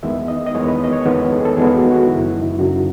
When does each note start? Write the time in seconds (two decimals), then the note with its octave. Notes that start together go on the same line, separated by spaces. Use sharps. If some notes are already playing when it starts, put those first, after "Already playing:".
0.03 E2 D#3 G#3 B3 E5
0.28 D#5
0.46 D#5
0.54 E2 D#3 G#3 B3 C#5
0.67 B4
0.84 D#5
0.93 C#5
1.05 E2 D#3 G#3 B3 B4
1.31 A4
1.38 G#4
1.45 A4
1.56 E2 D#3 G#3 B3 G#4
1.74 F#4
1.91 F#4
2.07 F#2 C#3 F#3 E4
2.25 D#4
2.43 E4
2.59 F#2 C#3 F#3 F#4